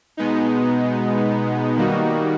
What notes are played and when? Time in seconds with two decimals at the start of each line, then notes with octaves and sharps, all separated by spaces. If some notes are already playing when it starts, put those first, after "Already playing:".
0.17 B2 G#3 B3 D#4
1.77 D#3 G3 A#3 D#4 F#4